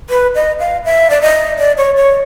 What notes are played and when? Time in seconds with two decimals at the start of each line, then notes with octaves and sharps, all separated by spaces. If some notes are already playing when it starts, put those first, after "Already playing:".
0.10 B4
0.35 D#5
0.60 F5
0.85 E5
1.10 D5
1.22 D#5
1.59 D5
1.78 C#5
1.97 C#5